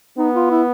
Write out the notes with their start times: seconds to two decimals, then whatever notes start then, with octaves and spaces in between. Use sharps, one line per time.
0.18 B3 D#4
0.35 F4
0.51 E4